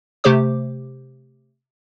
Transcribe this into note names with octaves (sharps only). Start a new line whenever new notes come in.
C3 A3 G4 C5 D6